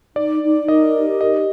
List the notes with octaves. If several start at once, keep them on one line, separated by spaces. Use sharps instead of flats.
D#4 D5
D#4
A#4 D#5
G4
D#4 D#5